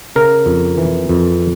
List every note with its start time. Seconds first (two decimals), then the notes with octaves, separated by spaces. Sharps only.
0.16 C#3 A#4
0.46 F2
0.78 E3
1.09 F2